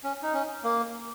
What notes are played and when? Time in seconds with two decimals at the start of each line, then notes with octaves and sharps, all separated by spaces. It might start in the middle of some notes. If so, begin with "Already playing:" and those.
0.04 C#4
0.23 D#4
0.34 C#4
0.64 A#3